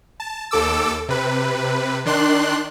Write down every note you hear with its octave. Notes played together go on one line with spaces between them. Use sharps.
A5
D#2 A4 D6 E6
C3 B4
D#3 D4 C6 F#6